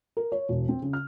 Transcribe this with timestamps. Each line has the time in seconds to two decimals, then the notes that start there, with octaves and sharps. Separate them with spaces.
0.17 A#4
0.32 C#5
0.49 E1
0.69 C4
0.82 C#3
0.93 F6